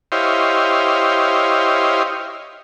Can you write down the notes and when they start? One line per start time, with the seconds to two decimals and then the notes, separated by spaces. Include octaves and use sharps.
0.12 E4 G4 C5 C#5 D#5 F5